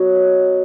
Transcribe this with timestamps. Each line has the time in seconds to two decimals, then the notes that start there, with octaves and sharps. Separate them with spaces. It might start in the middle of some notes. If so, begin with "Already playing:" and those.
Already playing: B2 F#3 C#5 D#5
0.15 B4